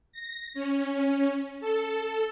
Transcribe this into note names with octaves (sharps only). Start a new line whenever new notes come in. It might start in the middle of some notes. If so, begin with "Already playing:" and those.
A#6
C#4
A4